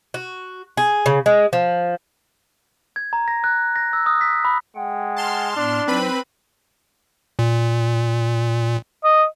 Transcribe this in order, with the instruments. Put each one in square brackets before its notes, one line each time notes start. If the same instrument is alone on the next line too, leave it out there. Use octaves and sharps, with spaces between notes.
[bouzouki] F#4
G#4
C#3
G#3
F3
[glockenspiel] G#6
A#5
A#6
F#6
A#6
E6
D#6
B6
B5
[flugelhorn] G#3 [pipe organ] F#5 G5
[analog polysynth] A5 C6 F6
[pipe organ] A2 B3 [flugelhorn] D4
[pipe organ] F#3 D#4 [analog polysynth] C4 B4 B5
[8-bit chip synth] A#2
[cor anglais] D#5